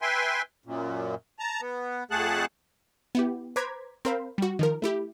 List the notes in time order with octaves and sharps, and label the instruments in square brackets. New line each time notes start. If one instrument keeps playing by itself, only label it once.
[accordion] B4 E5 G5 G#5 C6
F#2 A#2
A5 A#5
B3
F2 A3 G#4 F#5 A5 F#6
[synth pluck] B3 E4 G4
B4 C5 A#5 D6 G#6 B6
C4 A#4 C5 F5 B5
G3 F#4
D#3 F3 A#4
A3 E4 G4